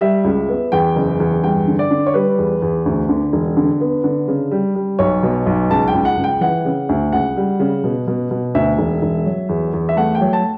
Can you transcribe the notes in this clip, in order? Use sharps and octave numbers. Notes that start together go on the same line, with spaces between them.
G3 E5
C#2
B3
E2 G5
F#1
E2
G2 G5
D3
D5
D3
C#5
G3 B4
E2
E2
D2
D3
E1
D3
B3
D3
C#3
G3
G3
B1 C#5
B2
B1
C#2 A5
G5
C#2
F#5
C#2
G5
E3 F#5
C#3
D2
C#2 F#5
G3
C#3
B2
B2
B2
D2 E5
E1
E1
F#3
E2
E2
E5
A3 F#5
G5
F#3
A5